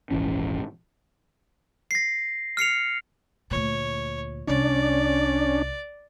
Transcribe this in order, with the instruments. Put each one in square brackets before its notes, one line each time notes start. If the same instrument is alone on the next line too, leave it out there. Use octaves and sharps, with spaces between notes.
[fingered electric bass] D#1 G#1 E3 C#4
[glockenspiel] A#6 C7
F6 C7 C#7 F7
[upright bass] D2 A#2 [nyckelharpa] C#5
[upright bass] C2 [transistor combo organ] C#4 D4 [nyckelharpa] D5